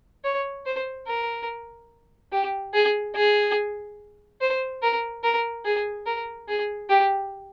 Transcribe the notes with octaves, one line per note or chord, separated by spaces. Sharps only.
C#5
C5
A#4
G4
G#4
G#4
C5
A#4
A#4
G#4
A#4
G#4
G4